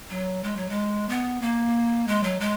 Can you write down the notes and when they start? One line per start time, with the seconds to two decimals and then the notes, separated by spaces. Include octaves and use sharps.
0.10 F#3
0.44 G#3
0.57 F#3
0.69 G#3
1.09 B3
1.42 A#3
2.08 G#3
2.23 F#3
2.40 G#3